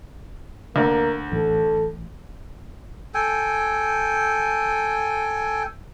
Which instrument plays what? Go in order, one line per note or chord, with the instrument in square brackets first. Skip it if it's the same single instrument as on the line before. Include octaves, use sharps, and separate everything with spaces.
[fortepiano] D2 [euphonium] A#3
[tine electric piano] A1 [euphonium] A4
[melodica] A4 G5 G#5